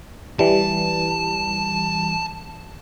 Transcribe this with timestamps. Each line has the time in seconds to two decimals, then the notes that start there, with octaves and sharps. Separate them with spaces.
0.39 E3 G3 A5